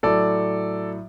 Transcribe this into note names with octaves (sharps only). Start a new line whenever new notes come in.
A2 F#3 A4 D5